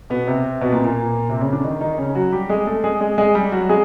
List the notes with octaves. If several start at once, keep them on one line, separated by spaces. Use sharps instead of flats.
B2 B3
C3 C4
B2 B3
A#2 A#3
A#2 A#3
C3 C4
C#3 C#4
D3 D4
D#3 D#4
D#3 D#4
C#3 C#4
F#3 F#4
G3 G4
G#3 G#4
A3 A4
G#3 G#4
G#3 G#4
G#3 G#4
G3 G4
F#3 F#4
G#3 G#4